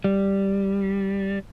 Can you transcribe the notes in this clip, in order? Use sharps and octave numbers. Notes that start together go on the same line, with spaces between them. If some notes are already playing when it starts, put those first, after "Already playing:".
G3